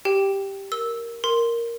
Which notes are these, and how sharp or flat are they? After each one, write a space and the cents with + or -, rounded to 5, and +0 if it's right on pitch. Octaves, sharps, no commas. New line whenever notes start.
G4 +0 G5 +0
A#4 +0 E6 -10
A#4 +0 C6 +0